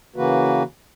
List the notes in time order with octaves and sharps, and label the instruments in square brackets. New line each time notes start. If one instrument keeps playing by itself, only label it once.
[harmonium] C#3 E3 A#3 F#4 B4